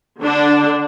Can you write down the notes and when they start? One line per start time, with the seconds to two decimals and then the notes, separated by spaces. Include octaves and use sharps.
0.19 D3 D4